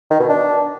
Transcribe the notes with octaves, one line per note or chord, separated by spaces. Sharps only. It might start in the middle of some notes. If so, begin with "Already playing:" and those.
D#3
B2
D4